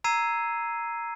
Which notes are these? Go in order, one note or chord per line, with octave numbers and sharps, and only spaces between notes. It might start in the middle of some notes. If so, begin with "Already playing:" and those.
A#5 E6 G#6 C7 D#7